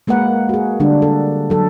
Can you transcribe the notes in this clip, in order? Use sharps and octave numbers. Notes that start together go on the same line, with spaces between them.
G#3 A#3 A#4 B4 F#5
F#4 G#4
D3 G3 D4
A4
F#3 A4